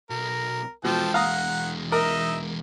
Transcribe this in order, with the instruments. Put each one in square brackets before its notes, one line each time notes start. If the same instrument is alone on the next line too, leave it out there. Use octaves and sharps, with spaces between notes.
[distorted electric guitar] B1 [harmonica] A#4
[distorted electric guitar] E2 G#3 [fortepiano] B2 [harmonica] F3 A4 G5
[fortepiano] F5 A#5 D#6 [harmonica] F#5
[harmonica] D#4 D#5 E5 [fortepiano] A#4